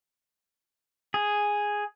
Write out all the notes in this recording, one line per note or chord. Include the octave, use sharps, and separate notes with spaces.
G#4